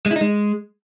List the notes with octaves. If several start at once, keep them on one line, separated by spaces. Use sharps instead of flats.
G#3
E4
D#4
G#3